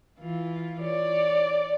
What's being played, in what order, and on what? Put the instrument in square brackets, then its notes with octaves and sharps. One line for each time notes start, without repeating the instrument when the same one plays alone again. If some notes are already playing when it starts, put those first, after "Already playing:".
[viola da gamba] E3 F4
[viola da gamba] C#5 [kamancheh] D5